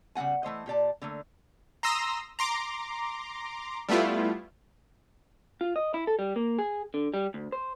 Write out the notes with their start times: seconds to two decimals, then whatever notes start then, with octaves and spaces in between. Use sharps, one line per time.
0.15 C#3 G3 A#3 F#5 G#5
0.43 E3 A3 C5 D#5
0.66 A#2 G4 D5 A5
1.02 D3 A3 A#3
1.83 A#5 C6 D#6 E6 A#6
2.39 A#5 C6 D6
3.89 G3 A3 B3 E4 F4
5.61 F4
5.76 D#5
5.94 E4
6.07 A4
6.19 G3
6.36 A#3
6.59 G#4
6.94 D3
7.14 G3
7.34 D2
7.52 C5